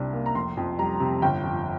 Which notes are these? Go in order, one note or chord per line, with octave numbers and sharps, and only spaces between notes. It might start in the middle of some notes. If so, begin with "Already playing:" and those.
Already playing: C2 C3 D4
A#3
A#5
F1 C6
F2
G3 A#5
C3
G1 G5
F2